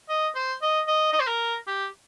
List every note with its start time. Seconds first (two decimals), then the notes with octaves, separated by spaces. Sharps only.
0.09 D#5
0.35 C5
0.62 D#5
0.88 D#5
1.13 D#5
1.20 C5
1.27 A#4
1.67 G4